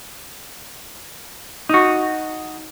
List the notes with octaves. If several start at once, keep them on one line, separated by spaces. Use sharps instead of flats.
D#4 F#4